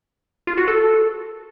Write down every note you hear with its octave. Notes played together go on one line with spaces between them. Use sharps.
F4
F#4
A4